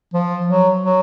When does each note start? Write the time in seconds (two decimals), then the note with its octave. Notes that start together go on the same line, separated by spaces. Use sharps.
0.14 F3
0.47 F#3
0.80 F#3